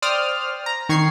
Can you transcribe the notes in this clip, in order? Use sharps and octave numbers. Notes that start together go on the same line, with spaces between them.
C5 D5 G5 D#6 F6
A#5
D#3 C#6 G#6 C7